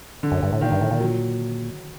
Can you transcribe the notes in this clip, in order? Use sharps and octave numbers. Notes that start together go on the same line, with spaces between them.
D3
F#2
G2
A2
A#2 D#3
G2
A2
A#2
F#3